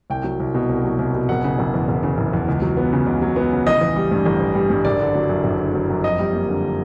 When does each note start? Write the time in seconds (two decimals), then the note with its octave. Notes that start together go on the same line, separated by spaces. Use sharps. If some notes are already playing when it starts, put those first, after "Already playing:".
0.10 C2 G5
0.24 F#3
0.40 C2
0.55 B2
0.69 C2
0.84 F#3
0.99 C2
1.14 B2
1.29 F#1 F#5
1.44 C#3
1.59 F#1
1.74 E2
1.88 F#1
2.03 C#3
2.18 F#1
2.33 E2
2.48 C#2
2.62 F#3
2.77 B3
2.93 C#3
3.06 C#2
3.22 F#3
3.36 B3
3.52 C#3
3.67 A1 D#5
3.81 E3
3.96 G3
4.11 G2
4.26 A1
4.40 E3
4.55 G3
4.70 G2
4.85 F#1 D5
5.00 D3
5.15 F#3
5.29 F#2
5.44 F#1
5.59 D3
5.74 F#3
5.90 F#2
6.04 F2 D#5
6.19 G3
6.33 A#3
6.49 D3